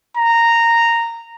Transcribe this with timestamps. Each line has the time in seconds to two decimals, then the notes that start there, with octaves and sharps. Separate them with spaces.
0.17 A#5